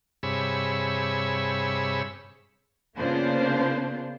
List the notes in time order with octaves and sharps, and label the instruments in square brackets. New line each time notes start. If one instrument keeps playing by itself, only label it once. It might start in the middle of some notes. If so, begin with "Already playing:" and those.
[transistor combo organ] G2 C3 G#4 C#5 B5 E6
[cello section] C#3 A#3 B3 D4 F4 C5